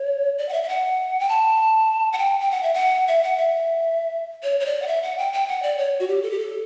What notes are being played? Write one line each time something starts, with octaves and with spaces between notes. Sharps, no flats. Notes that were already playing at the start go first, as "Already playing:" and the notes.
Already playing: C#5
D5
F#5
E5
E5
F#5
G5
A5
F#5
G5
G5
F#5
E5
F#5
E5
F#5
E5
C#5
C#5
D5
F#5
E5
F#5
G5
G5
F#5
D5
C#5
F#4
G4
A4
G4
A4